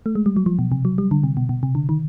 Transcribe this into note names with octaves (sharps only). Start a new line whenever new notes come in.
A3
G#3
G3
F#3
F3
B2
C3
F#3
G3
D3
C3
B2
B2
C3
D3
D#3